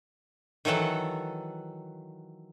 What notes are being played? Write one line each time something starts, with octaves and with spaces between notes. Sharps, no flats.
D#3 E3 F#3 A4 F#5